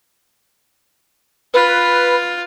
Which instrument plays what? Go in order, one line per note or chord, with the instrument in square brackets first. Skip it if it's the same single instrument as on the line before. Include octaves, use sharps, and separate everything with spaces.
[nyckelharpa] F4 [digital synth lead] B4